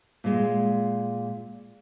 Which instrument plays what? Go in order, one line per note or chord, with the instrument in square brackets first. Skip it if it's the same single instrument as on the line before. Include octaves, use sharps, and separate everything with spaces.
[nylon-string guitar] A#2 G#3